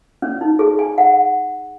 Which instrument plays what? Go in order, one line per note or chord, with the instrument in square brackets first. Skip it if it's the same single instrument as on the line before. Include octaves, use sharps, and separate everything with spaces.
[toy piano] C#4
D#4
G#4
G#5
F#5